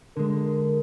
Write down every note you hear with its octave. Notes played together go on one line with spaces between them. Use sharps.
D3 G#3 A#4